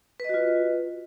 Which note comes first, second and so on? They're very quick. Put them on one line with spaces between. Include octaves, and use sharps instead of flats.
B4 D#5 F#4 F4